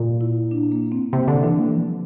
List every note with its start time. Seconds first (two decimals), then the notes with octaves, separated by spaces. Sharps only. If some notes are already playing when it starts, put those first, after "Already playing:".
Already playing: A#2
0.21 E4
0.51 D4
0.72 A#3
0.92 C4
1.13 C3 A#3
1.28 D3
1.44 E3 D4
1.59 A#3
1.74 F3